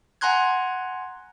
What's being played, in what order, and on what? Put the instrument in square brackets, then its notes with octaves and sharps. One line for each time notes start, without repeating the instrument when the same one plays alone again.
[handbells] F#5 G#5 A#5 C6 F#6 G#6